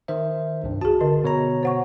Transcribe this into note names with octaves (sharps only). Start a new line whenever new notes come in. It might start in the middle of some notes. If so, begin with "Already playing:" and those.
D#3 C5 E5
C2 G2
F#4 G#4 A5
D3 A#4 D#5
B2 C#5 A#5
C5 F#5 C#6